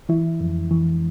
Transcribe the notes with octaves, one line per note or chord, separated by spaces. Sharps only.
E3 E4
F2
E3